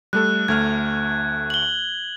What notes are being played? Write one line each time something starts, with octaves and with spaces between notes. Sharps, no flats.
G3 A3 A4 F#6
D2 A3 F6 G#6
F#7 G7